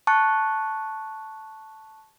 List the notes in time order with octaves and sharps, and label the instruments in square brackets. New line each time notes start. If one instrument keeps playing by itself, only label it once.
[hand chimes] A5 C#6 F#6